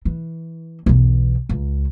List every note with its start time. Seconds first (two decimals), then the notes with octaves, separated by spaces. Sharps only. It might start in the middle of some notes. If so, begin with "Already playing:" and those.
0.05 E3
0.86 B1 E2
1.49 C#2